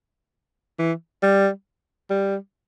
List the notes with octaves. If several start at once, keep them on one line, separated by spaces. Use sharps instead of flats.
E3
G3
G3